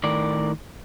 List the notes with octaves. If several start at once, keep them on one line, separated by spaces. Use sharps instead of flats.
A2 D#3 A#4 D5